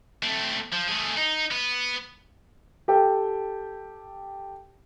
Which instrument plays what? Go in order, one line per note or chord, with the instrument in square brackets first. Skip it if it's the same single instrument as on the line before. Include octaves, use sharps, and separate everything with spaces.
[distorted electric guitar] A3 C4
F3
A3 G#4
D#4
B3
[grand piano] G4 A4 G5